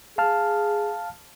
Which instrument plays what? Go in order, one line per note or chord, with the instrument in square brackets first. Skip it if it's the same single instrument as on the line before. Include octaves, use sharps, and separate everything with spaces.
[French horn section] G#4 [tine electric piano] F5 A5 F6